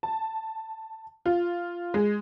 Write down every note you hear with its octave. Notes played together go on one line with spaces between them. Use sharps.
A5
F4
G#3